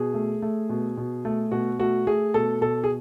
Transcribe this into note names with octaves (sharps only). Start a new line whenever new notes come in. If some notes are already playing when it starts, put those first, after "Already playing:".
Already playing: B2 G#4
A3
A3
B2
B2
A3
B2 F#4
A3 F#4
A3 G#4
B2 A4
B2 A4
G#4